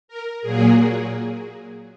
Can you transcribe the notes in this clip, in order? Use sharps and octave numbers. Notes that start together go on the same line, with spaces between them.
A#4
A#2 F#3 A#3 G#4